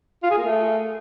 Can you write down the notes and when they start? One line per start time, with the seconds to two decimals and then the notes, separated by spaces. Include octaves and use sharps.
0.23 F4
0.30 G#4
0.38 A#3
0.45 A3